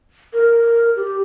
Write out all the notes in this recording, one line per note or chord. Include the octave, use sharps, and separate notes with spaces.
A#4
G4